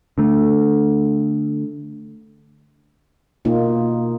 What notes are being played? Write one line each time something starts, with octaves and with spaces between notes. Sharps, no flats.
D3 A3
B2 A#3 D#4 F4